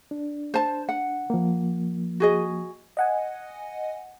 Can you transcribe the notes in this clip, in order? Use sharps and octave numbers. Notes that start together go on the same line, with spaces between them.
D4
C5 A5
F#5
F3 A#3
F#4 G#4 D#5
D#5 F#5 G#5